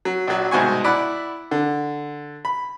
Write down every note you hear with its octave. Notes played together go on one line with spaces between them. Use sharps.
F#3
A#1 F#3
C2 G#2 B2 G#5 C#6
E4 D5 F#5 B5
D3
B5